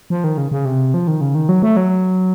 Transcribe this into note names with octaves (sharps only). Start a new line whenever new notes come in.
F3
D#3
C#3
C#3
C3
F3
D#3
C#3
D#3
F#3
A3
F#3